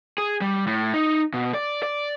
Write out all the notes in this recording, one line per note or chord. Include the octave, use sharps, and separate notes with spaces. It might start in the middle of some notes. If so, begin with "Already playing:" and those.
G#4
G3
A2
D#4
B2
D5
D5